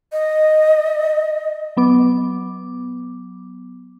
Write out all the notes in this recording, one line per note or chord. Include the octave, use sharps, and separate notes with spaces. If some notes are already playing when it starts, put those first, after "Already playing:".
D#5
F#3 B3 D6